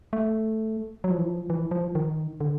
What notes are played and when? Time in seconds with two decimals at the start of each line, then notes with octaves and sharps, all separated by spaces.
0.13 A3
1.04 F#3
1.11 F3
1.18 E3
1.25 F3
1.50 E3
1.71 F3
1.95 D#3
2.41 D3